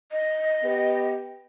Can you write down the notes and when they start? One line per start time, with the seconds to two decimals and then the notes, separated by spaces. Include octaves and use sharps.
0.12 D#5
0.64 B3 G4